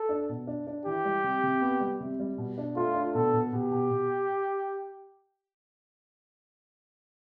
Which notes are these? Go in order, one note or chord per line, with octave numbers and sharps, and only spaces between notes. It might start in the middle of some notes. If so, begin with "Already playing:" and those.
Already playing: A4
D4
B2
D4
D4
E3 G4
G3
C3
C3
B3
G3
C3
G3
B2
D4
A3 F4
D4
B2 A4
B2
B2 G4
B2
B2